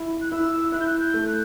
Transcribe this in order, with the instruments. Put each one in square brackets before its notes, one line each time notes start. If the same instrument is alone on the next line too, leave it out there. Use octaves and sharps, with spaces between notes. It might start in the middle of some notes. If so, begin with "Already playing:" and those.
Already playing: [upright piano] E4
[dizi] F#6
[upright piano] E4 [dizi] E6
[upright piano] E4 [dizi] F#6
[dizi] G6
F#6
G6
[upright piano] A3
[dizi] F#6